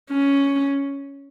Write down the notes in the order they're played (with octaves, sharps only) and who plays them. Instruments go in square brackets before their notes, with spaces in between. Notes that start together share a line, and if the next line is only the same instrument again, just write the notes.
[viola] C#4